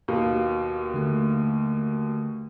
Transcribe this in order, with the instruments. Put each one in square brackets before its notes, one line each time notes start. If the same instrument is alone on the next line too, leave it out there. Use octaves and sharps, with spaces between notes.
[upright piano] D#2 B2 F5
[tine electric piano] D3 A3